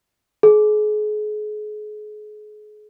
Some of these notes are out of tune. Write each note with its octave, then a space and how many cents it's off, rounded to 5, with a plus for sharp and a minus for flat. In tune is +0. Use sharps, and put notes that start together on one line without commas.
G#4 +35